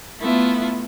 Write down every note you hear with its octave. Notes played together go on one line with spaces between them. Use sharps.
A3 B3 E4 F4